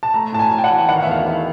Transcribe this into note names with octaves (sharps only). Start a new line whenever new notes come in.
A5
A3 A#5
A2 A5
G#5
A2
G5
F#5
E3
D#3 F#5
F5
E5
E2 F5
E2